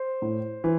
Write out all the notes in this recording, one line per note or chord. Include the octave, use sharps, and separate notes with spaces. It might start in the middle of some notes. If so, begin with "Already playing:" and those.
Already playing: C5
A2
E3